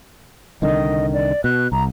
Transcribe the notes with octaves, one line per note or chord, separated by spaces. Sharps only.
C2 D3 D#3 D#5
D5
B2 F#6
C2 A#5